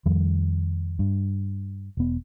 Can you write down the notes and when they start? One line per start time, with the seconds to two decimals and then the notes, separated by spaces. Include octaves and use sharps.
0.06 F2 D#3 F3 G3
0.99 G2
1.97 E1 B3